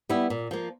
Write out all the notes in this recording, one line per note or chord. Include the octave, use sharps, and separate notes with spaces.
G3 B3 E4
A#2
F3 A#3